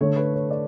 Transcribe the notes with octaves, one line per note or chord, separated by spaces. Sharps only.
D3 A3 C#5
B4
C#5
D5